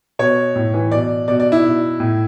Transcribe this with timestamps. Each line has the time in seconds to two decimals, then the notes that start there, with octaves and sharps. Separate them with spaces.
0.19 B2 C#5
0.56 A2
0.74 E3
0.91 B2 D5
1.28 B2 D5
1.40 D5
1.52 E4
1.64 B2
2.00 A2